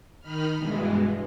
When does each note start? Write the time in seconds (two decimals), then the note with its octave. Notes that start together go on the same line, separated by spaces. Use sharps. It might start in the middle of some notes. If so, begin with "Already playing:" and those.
0.21 D#3 D#4 B5 F6
0.57 G2 B2 E3 G#3